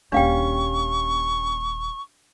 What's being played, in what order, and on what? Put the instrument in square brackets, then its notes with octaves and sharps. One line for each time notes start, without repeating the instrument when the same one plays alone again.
[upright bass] D#1 A#3 [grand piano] G3 C#4 [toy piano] D4 F5 G5 [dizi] C#6